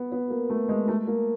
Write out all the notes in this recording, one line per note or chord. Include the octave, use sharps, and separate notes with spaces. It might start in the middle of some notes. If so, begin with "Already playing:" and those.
Already playing: B3
B3
A#3
A3
G#3
A3
A#3